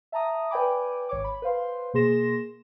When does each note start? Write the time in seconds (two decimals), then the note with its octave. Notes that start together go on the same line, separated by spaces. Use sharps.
0.12 E5 A5 A#5 D#6
0.51 B4 D5 G5 G#5 B5 D6
1.09 G#1 C#5 D6
1.24 B5
1.42 B4 C5 F5 C6
1.94 B2 A#3 G#4 C6 A#6 E7